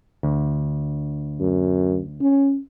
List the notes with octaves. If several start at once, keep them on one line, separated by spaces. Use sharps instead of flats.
D2
F#2
C#4